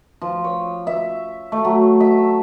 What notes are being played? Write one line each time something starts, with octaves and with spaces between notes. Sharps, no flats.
F3
C#5
E5
A3
F#3
E5